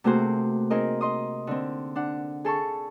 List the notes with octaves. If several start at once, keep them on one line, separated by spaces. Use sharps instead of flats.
C3 A3 A#3 F#4 G#4 C5
C4 D#4 G#4 A#4 D#5
D#5 C6 D#6
D3 C4
D4 F#5
G#4 A4 A5 C#6